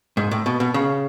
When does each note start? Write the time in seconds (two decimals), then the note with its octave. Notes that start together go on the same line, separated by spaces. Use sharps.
0.17 G#2
0.31 A2
0.46 B2
0.60 B2
0.74 C#3